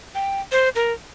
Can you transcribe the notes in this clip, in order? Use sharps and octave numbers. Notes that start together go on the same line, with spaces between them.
G5
C5
A#4